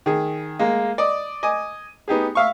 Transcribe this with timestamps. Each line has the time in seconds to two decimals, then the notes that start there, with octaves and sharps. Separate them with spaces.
0.06 D#3 G#4
0.59 G#3 A#3
0.98 D5 D#5
1.43 D#5 G#5 D6
2.08 B3 D#4 G4 G#4
2.35 E5 F5 C#6